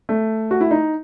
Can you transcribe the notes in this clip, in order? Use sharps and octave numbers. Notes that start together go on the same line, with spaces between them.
A3
F#4
E4
D#4